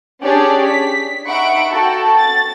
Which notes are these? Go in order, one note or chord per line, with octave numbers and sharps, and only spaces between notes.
C#4 D4 G4 G#4 C#5 D5
B6
D#4 E5 F#5 B5 C#6 D7
F#4 A4 G5 A5
A6